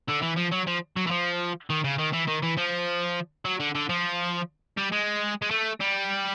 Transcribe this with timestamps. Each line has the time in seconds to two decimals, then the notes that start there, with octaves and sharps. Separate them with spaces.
0.09 D3
0.23 E3
0.38 F3
0.52 F#3
0.67 F3
0.96 F#3
1.07 E3
1.11 F3
1.70 D#3
1.84 C#3
1.99 D#3
2.14 E3
2.28 D#3
2.43 E3
2.57 F3
3.45 F#3
3.60 D3
3.75 D3
3.89 F3
4.77 G3
4.92 G#3
5.42 G#3
5.50 A3
5.80 G3